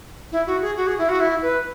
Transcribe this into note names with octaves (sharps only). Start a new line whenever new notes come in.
E4
F#4
G#4
F#4
G#4
E4
F#4
E4
B4